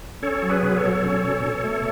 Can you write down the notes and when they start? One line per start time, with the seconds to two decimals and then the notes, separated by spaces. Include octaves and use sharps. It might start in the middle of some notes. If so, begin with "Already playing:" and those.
0.22 C#4 A4 C#5
0.42 F#3
0.50 G#4 B4
0.63 B2
0.76 A4 C#5
0.83 F#3
1.04 C#4
1.24 B2
1.44 B2
1.64 A3